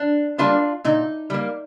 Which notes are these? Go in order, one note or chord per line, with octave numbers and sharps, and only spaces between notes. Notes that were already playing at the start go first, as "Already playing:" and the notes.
Already playing: D4
G3 A#3 D4 F4
A#2 D#4
G3 A#3